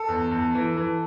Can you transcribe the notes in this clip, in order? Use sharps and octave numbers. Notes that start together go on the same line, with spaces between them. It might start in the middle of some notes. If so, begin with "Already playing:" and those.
Already playing: A4
E2
E2
E3
E3